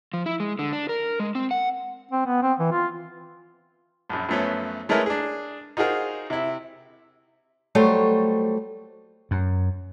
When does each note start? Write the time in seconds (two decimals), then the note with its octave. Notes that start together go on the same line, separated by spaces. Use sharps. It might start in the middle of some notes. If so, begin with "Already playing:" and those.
0.14 F3
0.26 E4
0.40 G#3
0.59 D3
0.73 D4
0.89 A#4
1.20 G#3
1.35 C4
1.51 F#5
2.11 C4
2.26 B3
2.43 C4
2.59 E3
2.72 F4
4.10 A#1 F#2
4.29 F#2 F3 A3 B3 C#4
4.89 G#3 A3 C#4 E4 A#4 B4
5.06 D4 G#4
5.77 D#4 F4 F#4 G#4 A#4 C5
6.30 C3 E4
7.75 F#3 G3 A3 C5 C#5
9.31 F#2